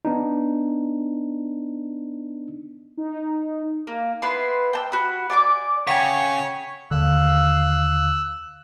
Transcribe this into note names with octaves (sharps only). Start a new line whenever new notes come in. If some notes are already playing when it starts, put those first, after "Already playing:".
B3 D4 D#4
D#4
A#3
B3 E4 B4 C6
G5 A5 E6
F#4 B5
D5 G#5 C6 D6
C#3 C#5 F#5 G5 G#6 B6 C#7
D#2 D3 F5 E6 F#6